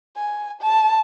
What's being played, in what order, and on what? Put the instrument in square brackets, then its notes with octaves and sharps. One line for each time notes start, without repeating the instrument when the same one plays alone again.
[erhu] G#5
A5